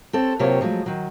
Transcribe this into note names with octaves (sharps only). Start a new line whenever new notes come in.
C4 A4 C#5
C3 F#3 A#3 F4 G4 C#5
F3 F#3 G#3 A3
D#3 F#3